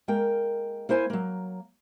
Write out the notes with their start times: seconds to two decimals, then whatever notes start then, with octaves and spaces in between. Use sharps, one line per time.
0.08 G#3 A#3 A#4 G5
0.89 A#3 E4 C5 G#5
1.10 F#3 A#3